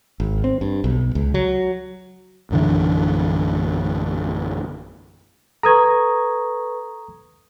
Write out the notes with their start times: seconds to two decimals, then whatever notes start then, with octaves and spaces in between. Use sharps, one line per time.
0.20 G#1
0.44 C4
0.61 G2
0.84 B1
1.15 C#2
1.34 F#3
2.50 A#1 F#2 D3 E3
5.63 A4 B4 A#5 C#6 D#6 G#6